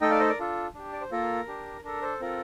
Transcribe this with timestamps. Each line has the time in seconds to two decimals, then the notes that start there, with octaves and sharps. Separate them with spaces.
0.01 A3 D#4 A4 D#5 G5
0.10 D5 F5
0.20 C5 D#5
0.29 A#4 D5
0.39 D4 F4 A4
0.74 D4 G4
0.93 D5
1.01 C5
1.11 A#3 F4 A4 A#4
1.47 D4 G4
1.84 D4 A4 A#4
2.02 A4 C5
2.20 C4 F4 A4 A#4